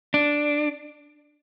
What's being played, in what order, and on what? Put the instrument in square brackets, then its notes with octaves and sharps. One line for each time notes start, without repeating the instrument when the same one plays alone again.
[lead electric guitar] D4